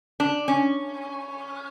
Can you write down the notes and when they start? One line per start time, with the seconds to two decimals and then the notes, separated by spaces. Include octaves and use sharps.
0.20 D4
0.48 C#4